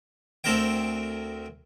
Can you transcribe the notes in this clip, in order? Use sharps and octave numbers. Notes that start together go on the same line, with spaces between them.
D2 C4 A4 A#4 G5